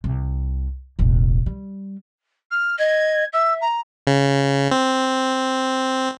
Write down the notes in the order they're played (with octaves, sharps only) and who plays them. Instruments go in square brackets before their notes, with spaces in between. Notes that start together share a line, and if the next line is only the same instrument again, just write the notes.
[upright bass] C2 C3
E1 A1
G3
[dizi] F6
[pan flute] D#5 [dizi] G#6
[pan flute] E5 [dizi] E6
[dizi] A#5
[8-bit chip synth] C#3
C4